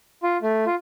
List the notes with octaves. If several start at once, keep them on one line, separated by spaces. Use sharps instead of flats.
F4
A3
F4